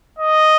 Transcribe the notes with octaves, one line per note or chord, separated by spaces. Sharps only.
D#5